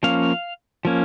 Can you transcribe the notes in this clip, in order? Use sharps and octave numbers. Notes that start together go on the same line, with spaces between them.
F3 A#3 C#4 F5
F3 A#3 C#4